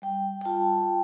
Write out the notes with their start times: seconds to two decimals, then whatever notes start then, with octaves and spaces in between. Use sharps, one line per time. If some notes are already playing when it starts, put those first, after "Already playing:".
0.02 G3 G5
0.41 G5
0.45 F4 A5